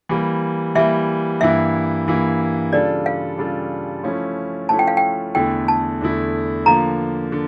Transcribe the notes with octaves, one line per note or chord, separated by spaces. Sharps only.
E3 G3 A#3
E3 G3 A#3 E5
G2 E3 A#3 E4 E5
G2 E3 A#3 E4
C#3 G3 D4 F4 A4 D5
F5
C#3 G3 D4 F4 A4
F3 A3 C#4 E4
F3 A3 C#4 E4 A5
G5
F5
G5
E2 D3 A3 E4 G5
A5
E2 D3 A3 E4
D3 F3 A#3 A#5
D3